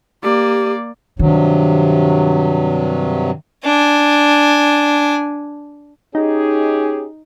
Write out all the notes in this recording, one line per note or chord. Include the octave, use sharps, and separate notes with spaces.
A#3 G4 D5
G2 C3 D#3 F#3
D4 G#5
C#4 D#4 G4 G#4